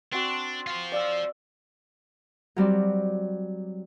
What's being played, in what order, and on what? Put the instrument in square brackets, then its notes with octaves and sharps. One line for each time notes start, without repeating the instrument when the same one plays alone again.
[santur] C4 F#4 [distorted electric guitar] D4
[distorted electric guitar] F4 C5
[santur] D5 F5 E6
[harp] F#3 G3 C4 D5